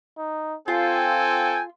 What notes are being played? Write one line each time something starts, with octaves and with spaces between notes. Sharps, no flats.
D#4
C4 F4 A4 G5 G#5